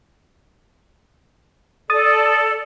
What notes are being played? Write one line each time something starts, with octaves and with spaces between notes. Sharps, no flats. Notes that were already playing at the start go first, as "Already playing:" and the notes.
A4 D5 D#6 A6